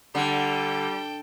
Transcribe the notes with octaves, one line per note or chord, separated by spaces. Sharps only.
D3 G3 A4 G5